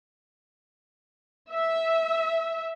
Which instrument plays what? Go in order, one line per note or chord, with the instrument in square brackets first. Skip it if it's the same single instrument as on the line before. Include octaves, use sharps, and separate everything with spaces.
[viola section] E5